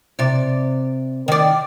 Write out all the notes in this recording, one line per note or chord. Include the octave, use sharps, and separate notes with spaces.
C3 D5
D#3 D5